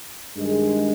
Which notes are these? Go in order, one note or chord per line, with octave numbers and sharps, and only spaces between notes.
G2 D#3 G#3